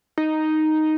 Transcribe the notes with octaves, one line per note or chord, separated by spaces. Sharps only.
D#4